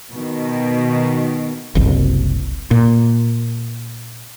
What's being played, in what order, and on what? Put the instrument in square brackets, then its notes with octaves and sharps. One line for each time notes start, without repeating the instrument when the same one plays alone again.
[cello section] B2 D#3
[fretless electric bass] F#1 C2
A#2